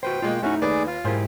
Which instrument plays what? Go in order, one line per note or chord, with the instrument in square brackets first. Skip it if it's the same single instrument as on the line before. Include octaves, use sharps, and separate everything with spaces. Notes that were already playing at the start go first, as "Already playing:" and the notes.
[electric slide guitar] F#4 B4 C5 [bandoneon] G5
[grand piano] B2 G#3 A#3 [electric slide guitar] F4
[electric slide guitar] A3 D#4 [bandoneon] C#4 F#4 [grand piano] E4
[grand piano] D#2 B4 G#5 [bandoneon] G#4 D5
[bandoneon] F4
[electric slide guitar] G#2 E4 G4 [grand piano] G#4 A#4 C5